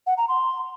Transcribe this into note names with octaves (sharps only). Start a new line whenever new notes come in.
F#5
A#5
C6